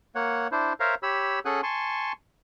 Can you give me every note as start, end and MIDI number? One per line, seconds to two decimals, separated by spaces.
0.15 0.48 58
0.15 0.48 73
0.15 0.48 78
0.52 0.73 62
0.52 0.73 64
0.52 0.73 72
0.80 0.95 70
0.80 0.95 72
0.80 0.95 73
0.80 0.95 76
0.80 0.95 77
0.80 0.95 82
1.03 1.39 67
1.03 1.39 73
1.03 1.39 83
1.03 1.39 88
1.45 1.61 61
1.45 1.61 68
1.45 1.61 69
1.45 1.61 78
1.45 1.61 80
1.45 1.61 90
1.63 2.12 80
1.63 2.12 81
1.63 2.12 84
1.63 2.12 85